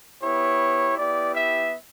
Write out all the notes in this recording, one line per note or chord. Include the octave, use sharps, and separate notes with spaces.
B3 E4 G4 C#5
B3 E4 G4 D5
E5